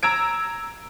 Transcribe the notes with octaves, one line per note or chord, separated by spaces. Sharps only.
A#5 E6 G#6 D7